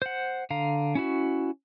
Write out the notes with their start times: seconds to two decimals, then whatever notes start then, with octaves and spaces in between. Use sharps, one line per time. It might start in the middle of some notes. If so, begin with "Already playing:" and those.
0.02 C5 F#5
0.50 D3 F5 A#5
0.95 C#4 E4 F#4